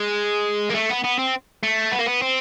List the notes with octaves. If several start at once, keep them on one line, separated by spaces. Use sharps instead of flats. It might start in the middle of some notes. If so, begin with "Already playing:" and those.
Already playing: G#3
A#3
A3
B3
B3
C4
A3
B3
A#3
B3
C4